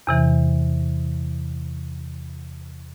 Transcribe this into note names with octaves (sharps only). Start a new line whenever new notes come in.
E2 C3 E3